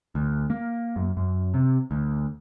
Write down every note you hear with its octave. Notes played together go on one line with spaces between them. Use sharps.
D2
A#3
F#2
F#2
C3
D2